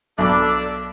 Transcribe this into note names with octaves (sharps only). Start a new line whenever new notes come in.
B1 D4 A4 B5 D6